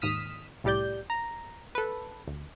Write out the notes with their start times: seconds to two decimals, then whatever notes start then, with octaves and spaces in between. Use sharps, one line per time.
0.01 D#2 G#2 D#6 F6 B6 E7
0.64 C2 A2 G3 G4 D5 G6
1.10 A#5
1.75 A4 B4
2.28 D2